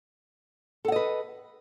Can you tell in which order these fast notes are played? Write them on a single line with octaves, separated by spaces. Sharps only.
A4 F#5 D#5 B4